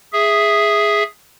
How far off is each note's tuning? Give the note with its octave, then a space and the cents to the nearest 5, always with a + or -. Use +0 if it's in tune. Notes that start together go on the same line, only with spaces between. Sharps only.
G#4 +0 E5 +0